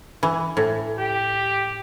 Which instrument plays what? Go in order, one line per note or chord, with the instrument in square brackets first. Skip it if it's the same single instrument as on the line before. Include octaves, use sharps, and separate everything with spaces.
[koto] E3
A2
[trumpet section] G4